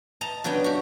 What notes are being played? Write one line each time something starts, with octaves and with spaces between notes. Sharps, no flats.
D#5 A5 A#5
C#3 F#3 B3 D4 G5
F#4 G4